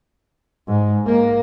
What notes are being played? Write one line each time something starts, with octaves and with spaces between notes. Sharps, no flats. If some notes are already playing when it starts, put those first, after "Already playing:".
G#2
A#3